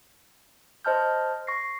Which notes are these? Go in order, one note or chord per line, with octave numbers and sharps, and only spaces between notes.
C5 D#5 A5 F6 G6
C#6 A#6 C7